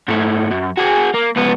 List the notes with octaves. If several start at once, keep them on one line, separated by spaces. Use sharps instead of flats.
G#2 A3
F#2
F#4 G#4
A#3
C#2 B3